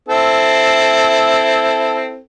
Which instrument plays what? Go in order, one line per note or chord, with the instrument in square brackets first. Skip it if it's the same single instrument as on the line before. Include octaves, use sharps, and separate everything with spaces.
[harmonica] C4 E4 A4